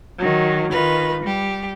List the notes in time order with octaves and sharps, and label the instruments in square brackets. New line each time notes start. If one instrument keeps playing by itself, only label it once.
[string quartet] D#3 F#3
D#3 F4 B4
G3 G4